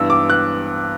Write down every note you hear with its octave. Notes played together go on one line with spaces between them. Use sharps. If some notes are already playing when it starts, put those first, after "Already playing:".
Already playing: G2 E3 B3 E6
D6
F#6